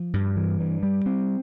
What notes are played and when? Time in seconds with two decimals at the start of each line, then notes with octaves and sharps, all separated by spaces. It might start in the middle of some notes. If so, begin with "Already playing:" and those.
Already playing: F3
0.13 G2
0.36 E3
0.60 G2
0.83 G3
1.06 C4